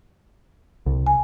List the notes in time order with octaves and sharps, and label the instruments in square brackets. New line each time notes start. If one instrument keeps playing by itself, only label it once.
[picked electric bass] C2
[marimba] G#5